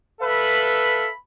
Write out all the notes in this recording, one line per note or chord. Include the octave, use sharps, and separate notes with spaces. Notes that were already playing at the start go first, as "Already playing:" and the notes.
A4 B4 E5 F5 B5